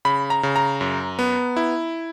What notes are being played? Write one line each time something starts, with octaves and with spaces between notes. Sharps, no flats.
C#3 B5
A#5
C#3
A#5
F#2
B3
E4